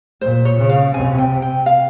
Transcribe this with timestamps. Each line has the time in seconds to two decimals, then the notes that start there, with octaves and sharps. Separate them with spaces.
0.21 A#2 C5
0.45 C#5
0.58 C#3
0.70 F5
0.94 C3 G#5
1.18 G5
1.30 C3
1.42 G5
1.66 F5